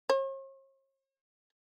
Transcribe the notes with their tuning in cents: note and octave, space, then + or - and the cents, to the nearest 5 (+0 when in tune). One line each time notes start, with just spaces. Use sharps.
C#5 -45